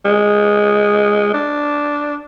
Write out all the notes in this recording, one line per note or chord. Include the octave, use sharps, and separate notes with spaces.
G#3
D4